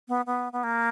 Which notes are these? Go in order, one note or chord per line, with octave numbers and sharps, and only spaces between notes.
B3
B3
B3
A#3